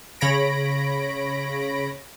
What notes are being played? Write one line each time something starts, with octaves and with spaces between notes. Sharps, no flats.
C#3 C#5 B5 A#6 D7